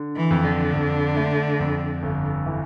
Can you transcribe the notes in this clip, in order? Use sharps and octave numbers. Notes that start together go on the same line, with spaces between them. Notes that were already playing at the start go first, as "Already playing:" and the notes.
Already playing: D3
E3
F2
D3
F2
A3
F2
G1
E3